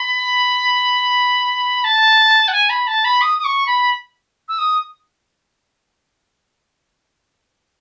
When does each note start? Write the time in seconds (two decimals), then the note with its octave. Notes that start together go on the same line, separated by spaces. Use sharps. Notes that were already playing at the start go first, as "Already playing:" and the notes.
Already playing: B5
1.84 A5
2.48 F#5
2.52 G#5
2.70 B5
2.87 A5
3.05 B5
3.21 D#6
3.39 D#6
3.44 C#6
3.67 B5
4.49 E6
4.59 D#6